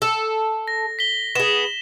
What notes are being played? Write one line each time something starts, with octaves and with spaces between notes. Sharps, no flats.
A4
A#6
B6 G7
B3 G#4 E7